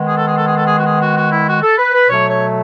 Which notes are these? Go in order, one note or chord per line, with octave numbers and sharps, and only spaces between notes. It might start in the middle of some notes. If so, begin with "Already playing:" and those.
Already playing: D#3 G#3 B3
G#4
A4
G#4
A4
G#4
A4
G#4
F#4
G#4
F#4
F#4
E4
F#4
A4
B4
B4
B2 F#3 A3 C#5
C#5